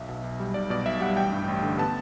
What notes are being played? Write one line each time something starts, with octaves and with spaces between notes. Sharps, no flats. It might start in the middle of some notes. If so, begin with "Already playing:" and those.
Already playing: B1 E5
B2
B1
G3
B1 D5
B2 D5
B1 E5
G3 F#5
A1 G5
G2
A1
D3
B3 A5